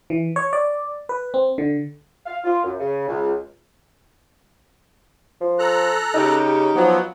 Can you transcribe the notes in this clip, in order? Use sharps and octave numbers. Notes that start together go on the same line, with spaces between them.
E3
C#5
D5
B4
C4
D3
F5
F4
F#2
C#3
C#2
F3
A4 A#5 F#6
C#3 C#4 D#4 G4
F3 F#3 B3